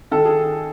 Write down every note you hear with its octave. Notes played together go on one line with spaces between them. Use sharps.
D#3 A4
G#4